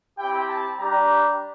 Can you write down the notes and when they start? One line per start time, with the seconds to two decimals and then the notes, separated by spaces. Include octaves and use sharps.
0.18 C4 E4 G4 G5
0.49 A5
0.78 G3 D4 G4 A#5